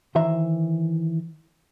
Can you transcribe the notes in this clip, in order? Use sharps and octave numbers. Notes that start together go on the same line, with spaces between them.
D#3 E3 C5 E5 A#5